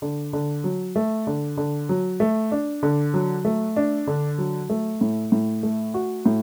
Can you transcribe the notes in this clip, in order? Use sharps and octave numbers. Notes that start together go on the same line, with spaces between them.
D3
D3
F#3
A3
D3
D3
F#3
A3
D4
D3
F#3
A3
D4
D3
F#3
A3
A2
A2
A3
F#4
A2